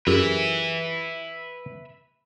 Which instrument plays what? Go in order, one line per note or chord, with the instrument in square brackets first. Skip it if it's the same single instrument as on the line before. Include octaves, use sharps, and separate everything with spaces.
[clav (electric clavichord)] F#2 [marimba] F4 G4 G#4 [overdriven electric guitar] B4 E5